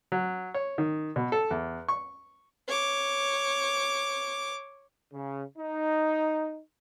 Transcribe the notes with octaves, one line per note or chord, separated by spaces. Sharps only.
F#3
C#5
D#3
B2
A4
E2
C#6
C#5 D6
C#3
D#4